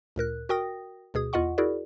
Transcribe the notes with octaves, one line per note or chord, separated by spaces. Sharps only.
D2 A#2 A#4 F#6
F#4 A#4 G5 D#6 A#6
D2 B2 G#4 D#6
E2 F4 D#5 F#5 C#6
E4 F#4 G#4 A#4 D5